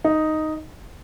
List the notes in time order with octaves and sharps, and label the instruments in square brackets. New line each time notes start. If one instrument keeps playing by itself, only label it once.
[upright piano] D#4